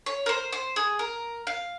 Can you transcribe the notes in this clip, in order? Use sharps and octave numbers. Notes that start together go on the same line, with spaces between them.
C#5
A#4
C5
C5
G#4
A#4
F5